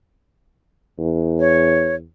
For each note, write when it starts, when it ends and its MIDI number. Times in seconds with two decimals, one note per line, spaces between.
0.99 2.05 40
1.39 1.95 73